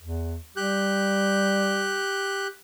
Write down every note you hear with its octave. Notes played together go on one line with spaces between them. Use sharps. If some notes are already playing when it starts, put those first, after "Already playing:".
E2
G3 G4 F#6 G6